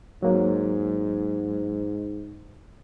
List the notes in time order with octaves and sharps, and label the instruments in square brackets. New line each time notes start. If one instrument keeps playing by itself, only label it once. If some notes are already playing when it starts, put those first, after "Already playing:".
[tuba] G#2 [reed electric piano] F#3 A#3